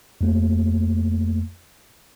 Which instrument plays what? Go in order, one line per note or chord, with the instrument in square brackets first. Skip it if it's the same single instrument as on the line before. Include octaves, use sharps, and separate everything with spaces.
[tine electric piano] F2 A3 A#3